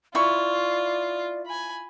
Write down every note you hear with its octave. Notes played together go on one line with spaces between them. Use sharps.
E4 F4 D5 C#6
G#5 B5